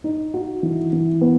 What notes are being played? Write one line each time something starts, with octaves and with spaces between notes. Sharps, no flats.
D#4
F#4
E3
E3
B3